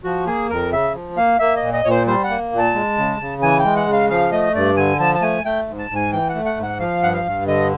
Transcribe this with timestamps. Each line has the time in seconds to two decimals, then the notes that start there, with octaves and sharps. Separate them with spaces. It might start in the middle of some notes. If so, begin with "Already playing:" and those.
0.04 F3 F#4
0.27 A#3 G#4
0.50 F2 A#4
0.72 C#3 E5
0.94 F3
1.17 A#3 F5
1.39 A#3 E5
1.56 D#5
1.62 A#2
1.73 D#5
1.85 A#2 C#5
1.90 C5
2.07 G3 C5
2.24 F#5
2.29 A#3
2.52 A#2
2.58 A5
2.74 G#3
2.98 C#3
3.20 C#3
3.42 E3 G#5
3.59 G5
3.65 G#3
3.76 F#5
3.87 C#3
3.93 F5
4.10 F3 F5
4.32 A3 D#5
4.55 G2 D5
4.77 D3 G#5
5.00 F3 A5
5.15 A5
5.22 A3 G#5
5.45 A3 G5
5.68 G#2
5.79 A5
5.90 G#2
5.96 G#5
6.12 E3 G5
6.29 F#5
6.35 A3
6.46 F#5
6.57 G#2
6.63 F#5
6.80 F3 F5
7.03 G2 F#5
7.13 F5
7.25 G2
7.47 D3 D#5